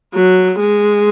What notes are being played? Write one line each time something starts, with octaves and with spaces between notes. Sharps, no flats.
F#3
G#3